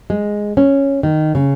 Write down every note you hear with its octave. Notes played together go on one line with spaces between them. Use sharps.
G#3
C#4
D#3
C#3